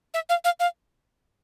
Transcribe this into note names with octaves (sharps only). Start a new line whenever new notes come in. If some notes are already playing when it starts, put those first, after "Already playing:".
E5
F5
F5
F5